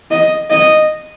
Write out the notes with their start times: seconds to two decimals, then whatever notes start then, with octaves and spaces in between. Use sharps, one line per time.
0.11 D#5
0.50 D#5